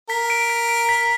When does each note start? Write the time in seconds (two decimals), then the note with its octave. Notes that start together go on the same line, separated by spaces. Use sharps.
0.09 A#4 B6
0.30 D7
0.50 B6
0.69 D7
0.89 B6